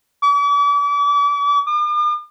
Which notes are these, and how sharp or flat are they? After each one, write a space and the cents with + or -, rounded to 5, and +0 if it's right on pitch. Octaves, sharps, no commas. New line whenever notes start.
D6 -40
D6 +45